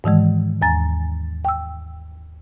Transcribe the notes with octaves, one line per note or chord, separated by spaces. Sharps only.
G#2 D#3 E3 G#3
D#2 G#5 A#5 A6
G5 E6